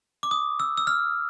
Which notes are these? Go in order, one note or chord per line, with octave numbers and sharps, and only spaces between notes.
D6
D#6
E6
E6
F6